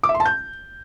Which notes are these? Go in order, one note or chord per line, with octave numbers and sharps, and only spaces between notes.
D6
E5
C6
A5
G6